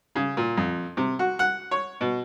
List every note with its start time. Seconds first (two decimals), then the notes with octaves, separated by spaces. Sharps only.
0.15 C#3
0.37 A#2
0.57 F2
0.97 C3
1.19 F#4
1.39 F#5
1.71 C#5
2.01 B2